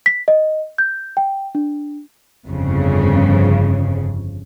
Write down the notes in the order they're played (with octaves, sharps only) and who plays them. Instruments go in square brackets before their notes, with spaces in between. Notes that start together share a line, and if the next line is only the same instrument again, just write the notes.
[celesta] B6
D#5
G6
G5
D4
[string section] G1 F2 C#3